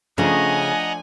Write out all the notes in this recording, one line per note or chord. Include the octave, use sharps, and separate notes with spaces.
C#3 F3 A3 D4 D#5 F#5 G#5 A#5